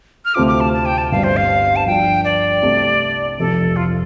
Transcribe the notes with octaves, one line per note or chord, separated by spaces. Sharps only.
F6
D2 C3 A3 C4 F4 D6
D6
A5
A5
G5
A5
G1 G2 G3 F5
C5
F5
A5
G2 F3 D4 G5
D5
C2 C3 A3
F1 F2 C3 A4
F4